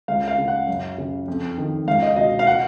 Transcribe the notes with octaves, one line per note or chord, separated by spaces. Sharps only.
C#2 F5
F5
C#3
F#5
F#2
C#3
F2
D#3
C#2 F5
D#5
B2 D#5
F5
F#5